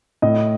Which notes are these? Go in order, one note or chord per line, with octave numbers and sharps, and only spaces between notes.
A2 D#5